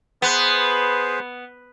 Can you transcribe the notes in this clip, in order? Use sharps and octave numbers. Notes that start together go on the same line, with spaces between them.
B3 G#4 B4 C5